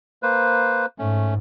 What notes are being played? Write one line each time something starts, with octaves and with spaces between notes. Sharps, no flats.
A#3 B4 C5
G#2 A3 C#4